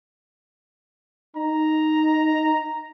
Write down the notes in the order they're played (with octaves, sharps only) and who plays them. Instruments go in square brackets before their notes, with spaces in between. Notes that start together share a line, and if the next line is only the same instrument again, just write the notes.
[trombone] D#4 [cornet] A#5